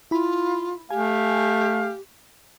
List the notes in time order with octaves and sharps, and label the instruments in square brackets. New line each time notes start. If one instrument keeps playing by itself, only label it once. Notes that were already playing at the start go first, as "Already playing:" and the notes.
[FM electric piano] E4 B5 [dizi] F4
[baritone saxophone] A3 [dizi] G4 [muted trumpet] F5 [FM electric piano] G#5